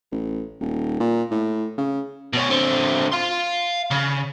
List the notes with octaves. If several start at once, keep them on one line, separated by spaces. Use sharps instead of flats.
A1
D#1
A#2
A2
C#3
B2 C#4
D3 C4
F5 C6
C#3